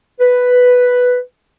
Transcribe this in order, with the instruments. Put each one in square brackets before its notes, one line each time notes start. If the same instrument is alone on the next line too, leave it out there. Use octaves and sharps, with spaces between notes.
[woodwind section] B4